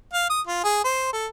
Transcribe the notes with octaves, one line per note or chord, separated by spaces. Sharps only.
F5
D#6
F4
G#4
C5
A4